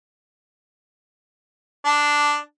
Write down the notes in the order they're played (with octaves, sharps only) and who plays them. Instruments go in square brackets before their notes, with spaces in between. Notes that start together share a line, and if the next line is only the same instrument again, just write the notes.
[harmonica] D4